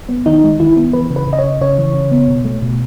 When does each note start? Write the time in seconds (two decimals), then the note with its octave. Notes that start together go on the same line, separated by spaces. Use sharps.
0.09 B3
0.26 D#3 D#4
0.44 G#3
0.60 D#3 E4
0.76 B3
0.93 E3 B4
1.10 C#3
1.16 B4
1.27 C#3
1.33 D#5
1.39 C#5
1.44 C#3
1.61 C#3 C#5
1.78 E3
1.94 C#3
2.11 B3
2.28 B2
2.45 A3
2.62 B2